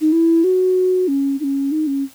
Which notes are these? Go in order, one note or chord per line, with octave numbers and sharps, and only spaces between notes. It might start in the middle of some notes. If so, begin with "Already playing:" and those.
D#4
E4
F#4
C#4
D#4
C#4
D#4
C#4